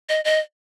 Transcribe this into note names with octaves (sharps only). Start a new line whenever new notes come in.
D#5
D#5